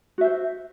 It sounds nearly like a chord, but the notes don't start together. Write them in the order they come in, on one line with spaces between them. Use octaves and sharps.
F#4 E5 C5